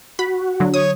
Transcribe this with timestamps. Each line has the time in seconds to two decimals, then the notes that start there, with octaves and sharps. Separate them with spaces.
0.19 F#4 B5
0.60 D3 F#3
0.74 C#5 D#6